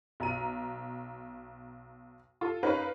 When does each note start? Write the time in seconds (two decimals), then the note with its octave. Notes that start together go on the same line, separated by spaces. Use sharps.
0.20 B1 A#5 D#7
2.41 F4 A4
2.63 C#4 D#4 A#4 B4 F5